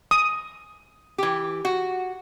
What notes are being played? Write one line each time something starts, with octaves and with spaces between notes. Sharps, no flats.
D#6
E3 G4
F#4